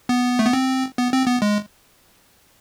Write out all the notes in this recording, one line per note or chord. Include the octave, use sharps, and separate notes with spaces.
B3
A3
B3
C4
B3
C4
B3
G#3